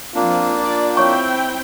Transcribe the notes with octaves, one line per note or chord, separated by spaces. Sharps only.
F3 A#3 C4 D4 F4
D5
C4 E4 C#5 G5 C#6